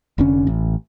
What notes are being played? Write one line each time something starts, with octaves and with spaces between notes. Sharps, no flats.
F1 D3 C#4
A1